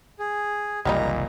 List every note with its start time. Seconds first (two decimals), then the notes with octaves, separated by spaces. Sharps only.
0.19 G#4
0.85 F#1 C2 A#2 D#3 E3 G3 D#4 A#5